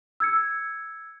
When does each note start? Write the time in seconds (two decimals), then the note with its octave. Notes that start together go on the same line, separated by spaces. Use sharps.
0.20 E6 G#6 C#7